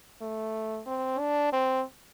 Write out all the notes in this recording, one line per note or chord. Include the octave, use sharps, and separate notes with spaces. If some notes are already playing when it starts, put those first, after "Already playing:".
A3
C4
D4
C4